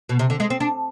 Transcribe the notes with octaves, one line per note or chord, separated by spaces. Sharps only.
B2
C3
D3
G#3
C4
D4